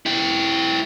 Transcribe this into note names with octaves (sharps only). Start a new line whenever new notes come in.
E4 G4